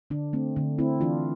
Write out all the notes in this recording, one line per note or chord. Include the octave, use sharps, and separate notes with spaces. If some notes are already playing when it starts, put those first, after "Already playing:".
D3 D4
A3 C4
D3 D4
A3 C4 E4
E3 D4 F4